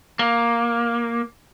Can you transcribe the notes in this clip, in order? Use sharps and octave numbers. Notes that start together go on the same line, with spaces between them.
A#3